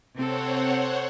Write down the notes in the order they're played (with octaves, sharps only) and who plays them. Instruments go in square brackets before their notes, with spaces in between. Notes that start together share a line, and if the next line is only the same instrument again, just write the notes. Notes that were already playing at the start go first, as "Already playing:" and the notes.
[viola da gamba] C3 C4 A4 [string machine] C5 C#5 F#5